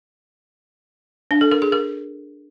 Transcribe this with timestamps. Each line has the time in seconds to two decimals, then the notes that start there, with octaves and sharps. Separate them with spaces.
1.31 D4
1.41 A4
1.51 A#4
1.62 G#4
1.72 A#4